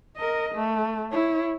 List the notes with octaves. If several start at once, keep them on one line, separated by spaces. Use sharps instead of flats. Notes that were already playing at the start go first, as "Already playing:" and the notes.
A#4 D#5
A3
E4 C#5